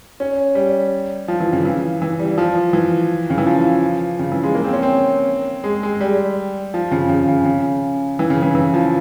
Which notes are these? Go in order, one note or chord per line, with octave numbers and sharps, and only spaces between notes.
C#4
G3
F3
E3
C#3
E3
E3
G3
F3
E3
C#3
E3
F3
C#3
E3
G#3
A#3
C4
C#4
C4
G#3
G#3
G3
F3
C#3
C#3
C#3
C#3
E3
C#3
E3
E3
F3